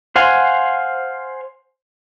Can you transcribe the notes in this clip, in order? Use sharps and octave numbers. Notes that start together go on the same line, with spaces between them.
C5 F5 F#5 G#5 C6